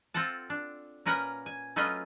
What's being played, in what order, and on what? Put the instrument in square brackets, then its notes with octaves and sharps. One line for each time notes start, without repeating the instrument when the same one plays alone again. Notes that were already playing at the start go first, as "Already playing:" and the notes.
[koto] C4 F4 A4 F#5 A5
D4
A#2 C#4 A#4 B4 F#5 A#5
G#5
F#3 A3 C#4 F4 B4 D#5